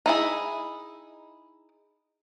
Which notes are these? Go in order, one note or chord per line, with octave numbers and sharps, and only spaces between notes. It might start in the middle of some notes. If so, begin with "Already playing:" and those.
D#4 E4 G#4